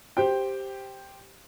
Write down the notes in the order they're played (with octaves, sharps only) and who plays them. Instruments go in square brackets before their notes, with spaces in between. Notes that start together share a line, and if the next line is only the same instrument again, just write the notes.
[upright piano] G4 C5 G5